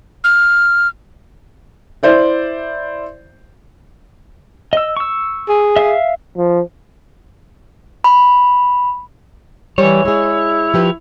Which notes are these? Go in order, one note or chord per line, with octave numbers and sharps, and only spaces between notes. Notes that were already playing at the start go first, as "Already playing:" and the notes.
F6
E4 C5 D5 E5
D#5 E6
C#6 E6
G#4
E5 F5
F3
B5
E3 G3 C#5
G#3 E4 G#4
F3 G4 B4